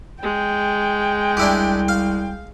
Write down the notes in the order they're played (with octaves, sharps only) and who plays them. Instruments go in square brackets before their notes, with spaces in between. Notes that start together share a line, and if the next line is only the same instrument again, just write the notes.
[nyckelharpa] G#3 [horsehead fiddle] G5
[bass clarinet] C2 [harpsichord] D4 E4 G4
[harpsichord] F5